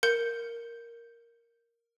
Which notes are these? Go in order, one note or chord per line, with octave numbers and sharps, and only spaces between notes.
A#4 G6 C#7